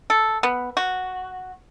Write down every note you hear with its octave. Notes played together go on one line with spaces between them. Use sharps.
A4
B3
F#4